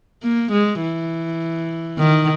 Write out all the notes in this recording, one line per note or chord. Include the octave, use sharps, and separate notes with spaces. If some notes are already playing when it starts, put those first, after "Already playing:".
A#3
G#3
E3
D#3